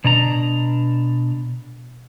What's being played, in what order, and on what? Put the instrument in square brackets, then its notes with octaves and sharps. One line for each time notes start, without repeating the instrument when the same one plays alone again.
[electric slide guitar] B2 D4 A#5